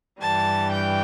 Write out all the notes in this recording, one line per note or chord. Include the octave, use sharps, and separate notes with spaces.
G2 E3 G3 A5
G5